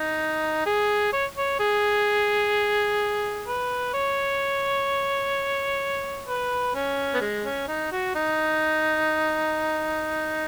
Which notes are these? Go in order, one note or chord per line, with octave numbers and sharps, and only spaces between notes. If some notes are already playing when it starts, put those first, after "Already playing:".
Already playing: D#4
G#4
C#5
C#5
G#4
B4
C#5
B4
C#4
B3
G#3
C#4
D#4
F#4
D#4